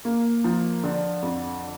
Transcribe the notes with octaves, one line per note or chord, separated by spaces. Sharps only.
A#3
F3
D3
F2